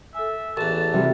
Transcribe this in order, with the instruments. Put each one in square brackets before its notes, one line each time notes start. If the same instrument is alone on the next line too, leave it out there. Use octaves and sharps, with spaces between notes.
[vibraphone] A4 G#5 [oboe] E5
[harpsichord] A1 E2 [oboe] A5
[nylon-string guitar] C3 G3 [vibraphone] F#4